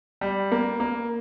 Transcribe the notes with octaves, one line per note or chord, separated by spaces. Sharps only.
G3
A#3
A#3